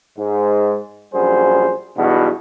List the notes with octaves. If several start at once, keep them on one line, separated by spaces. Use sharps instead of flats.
G#2
A#1 F#2 G3 G#4 C5
B1 E2 G2 B2